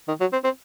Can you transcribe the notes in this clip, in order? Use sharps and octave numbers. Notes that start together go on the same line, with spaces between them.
D#3
F#3
C4
C4